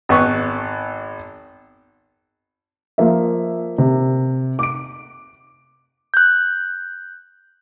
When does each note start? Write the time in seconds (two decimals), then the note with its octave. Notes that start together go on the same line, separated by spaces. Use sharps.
0.09 G#1 B3 C#6
2.98 F3 A#3 E5
3.78 C3
4.59 D6 D7
6.14 F#6 G6